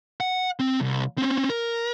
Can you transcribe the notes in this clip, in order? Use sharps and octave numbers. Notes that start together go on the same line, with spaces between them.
F#5
C4
C2
C4 C#4
A#4